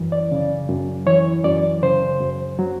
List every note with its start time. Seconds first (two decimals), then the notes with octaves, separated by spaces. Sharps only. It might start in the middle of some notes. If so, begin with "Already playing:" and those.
Already playing: F#2 E3
0.12 D5
0.32 C#3
0.69 F#2
1.06 E3 C#5
1.44 F#2 D5
1.83 C#3 C5
2.20 F#2
2.59 F#3